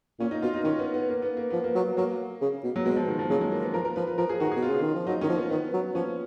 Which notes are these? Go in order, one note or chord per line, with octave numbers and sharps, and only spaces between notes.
A#2 C#4
D#4
B2 F4
D#4
D#3 C#4
B3
B3
A#3
B3
A#3
F3 B3
A#3
F#3
F#3 A#3
C#3
B2
F#3
B2 G#3
F3
D#3
F3
C#3 F#3
G#3
A#3
B3
F3 A#4
A#4
F3 B4
B4
F3 A#4
G#4
D#3 F#4
G#4
B2
F4
C#3
D#3
F3
F#3 D#4
D#3 C#4
F3
B3
D#3 B3
F#3
F3 C#4